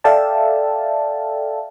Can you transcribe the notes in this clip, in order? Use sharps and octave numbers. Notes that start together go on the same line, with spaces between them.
A4 D5 E5 F5 G5 A5